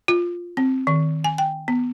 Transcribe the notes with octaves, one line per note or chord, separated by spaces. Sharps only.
F4
C4
D#3
G#5
G5
B3